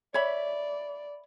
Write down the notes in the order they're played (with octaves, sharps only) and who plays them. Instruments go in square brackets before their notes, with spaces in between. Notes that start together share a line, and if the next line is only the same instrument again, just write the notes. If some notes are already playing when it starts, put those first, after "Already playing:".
[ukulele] C#5 E5 B5 [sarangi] D5